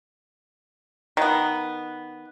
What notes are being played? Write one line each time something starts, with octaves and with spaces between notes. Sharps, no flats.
D#3 B3